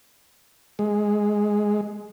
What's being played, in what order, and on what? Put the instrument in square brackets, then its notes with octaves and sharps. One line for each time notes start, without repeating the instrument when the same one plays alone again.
[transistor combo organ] G#3